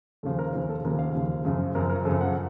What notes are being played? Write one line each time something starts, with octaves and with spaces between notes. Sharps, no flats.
D#2 C#3 F3 A4
A#4
D#2 C#3 F3 C5
A4
D#2 C#3 F3 A#4
F5
D#2 C#3 F3
F#2 C#3 F3
F#2 C#3 F3 A#4
A#4
F#2 C#3 F3 A4
F#5